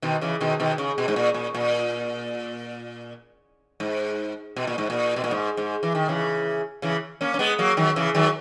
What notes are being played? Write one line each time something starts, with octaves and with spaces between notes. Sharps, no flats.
B2 D#3
C#3 E3
B2 D#3
B2 D#3
C#3
B2
G#2
A#2
A#2
A#2
G#2
B2
A#2
G#2
A#2
B2
A#2
G#2
G#2
E3
D#3
C#3 E3
C#3 E3
A#3 C#4
C#4
G#3 B3
F#3 A#3
D#3 F#3
C#3 E3
D#3 F#3